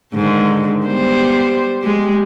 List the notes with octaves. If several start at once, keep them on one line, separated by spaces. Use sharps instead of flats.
G#2 D3 D#3
G3 B3 C5
G#3 G4